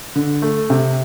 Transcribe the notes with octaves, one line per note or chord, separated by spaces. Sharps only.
D3
A3
C3